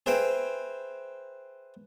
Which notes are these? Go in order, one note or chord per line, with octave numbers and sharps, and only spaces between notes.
G#4 B4 C5 E5 G5 A#5